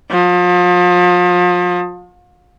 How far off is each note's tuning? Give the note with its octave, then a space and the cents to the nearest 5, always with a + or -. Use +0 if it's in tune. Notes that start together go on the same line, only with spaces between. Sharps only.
F3 +35